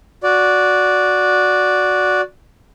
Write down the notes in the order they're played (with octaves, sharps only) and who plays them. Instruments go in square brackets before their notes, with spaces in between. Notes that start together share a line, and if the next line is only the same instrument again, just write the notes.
[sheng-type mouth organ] F#4 D5